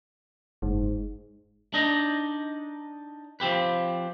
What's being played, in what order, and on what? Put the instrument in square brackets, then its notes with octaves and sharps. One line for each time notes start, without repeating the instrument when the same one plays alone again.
[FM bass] F#1 [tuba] G#2
[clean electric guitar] D4 D#4 D#5
F3 C4 G4 B4